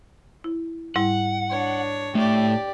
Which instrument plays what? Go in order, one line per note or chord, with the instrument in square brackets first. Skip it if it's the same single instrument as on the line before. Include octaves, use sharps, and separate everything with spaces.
[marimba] E4
[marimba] G#2 G3 E4 [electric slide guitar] F#5
[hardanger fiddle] D4 C#5
[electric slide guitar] A2 A3 [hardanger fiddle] G4 D5